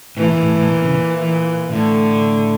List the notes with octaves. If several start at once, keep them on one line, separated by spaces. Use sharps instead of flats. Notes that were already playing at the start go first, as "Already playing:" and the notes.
A2 E3
A#2
A2
A2
A#2
C#3
A#2
E3
A2 D3